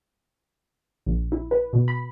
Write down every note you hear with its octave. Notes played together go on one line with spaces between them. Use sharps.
A#1
E4
B4
B2
B5